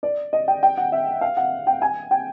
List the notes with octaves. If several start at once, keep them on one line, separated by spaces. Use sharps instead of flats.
D5
D#5
G5
G5
F#5
E5
F5
F#5
G5
G#5
G5